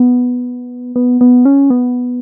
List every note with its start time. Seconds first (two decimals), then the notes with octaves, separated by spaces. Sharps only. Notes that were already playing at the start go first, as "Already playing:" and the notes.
Already playing: B3
0.96 B3
1.21 B3
1.45 C#4
1.70 B3